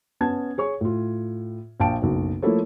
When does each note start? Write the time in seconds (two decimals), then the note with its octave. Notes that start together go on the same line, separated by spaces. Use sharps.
0.21 B3 C#4 A5 G#6
0.58 G#4 C#5 C#6
0.81 A2 F4
1.80 A#1 F5 G5 A5 D7
2.02 F#1 B1
2.42 F3 A3 A#3 E4 A4 C#5